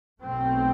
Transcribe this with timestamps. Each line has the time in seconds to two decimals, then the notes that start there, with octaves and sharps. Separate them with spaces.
0.21 B1 B2 A3 C4